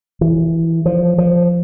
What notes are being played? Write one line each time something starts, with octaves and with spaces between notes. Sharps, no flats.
E3
F3
F3